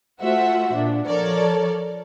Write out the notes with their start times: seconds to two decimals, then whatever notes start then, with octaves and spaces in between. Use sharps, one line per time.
0.22 A3 F4 F#4 C5 E5 F#5
0.74 A#2 D4
1.08 F3 A4 A#4 C#5 D5